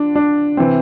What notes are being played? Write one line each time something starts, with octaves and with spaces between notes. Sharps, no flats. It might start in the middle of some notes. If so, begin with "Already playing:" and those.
Already playing: D3 F3 D4
D4
C3 E3 C4